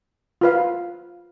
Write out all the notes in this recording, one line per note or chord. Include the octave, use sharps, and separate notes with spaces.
F4 B4 F5